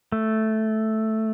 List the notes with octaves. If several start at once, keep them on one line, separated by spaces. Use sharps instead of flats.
A3